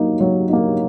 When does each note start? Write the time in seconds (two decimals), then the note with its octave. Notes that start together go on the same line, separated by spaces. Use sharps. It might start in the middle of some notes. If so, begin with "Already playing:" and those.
Already playing: F#3 A#3 D#4
0.20 F#3
0.49 A#3 D#4